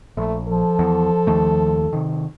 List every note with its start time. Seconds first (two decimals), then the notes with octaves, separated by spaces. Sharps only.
0.17 A#1 A3
0.48 F3 A4
0.79 E2
1.27 D#2 D#3 A3
1.93 C3 D#3